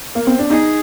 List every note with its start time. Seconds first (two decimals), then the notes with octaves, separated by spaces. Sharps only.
0.15 A#3
0.27 C4
0.39 D4
0.50 D#4 G#4